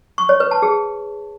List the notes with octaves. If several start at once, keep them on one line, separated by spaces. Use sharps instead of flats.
C#6
C#5
B4
A5
G#4